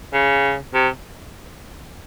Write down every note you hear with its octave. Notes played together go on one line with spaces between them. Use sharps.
C#3
C3